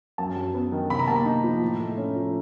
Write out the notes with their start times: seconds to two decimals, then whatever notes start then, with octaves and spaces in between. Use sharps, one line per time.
0.18 F#2 A5
0.36 F#3
0.54 B3
0.72 D#3
0.90 C3 B5
0.99 A#5
1.07 A#3 A5
1.16 A#5
1.25 D#4
1.44 F3
1.61 A2
1.80 A3
1.98 C#4
2.16 F3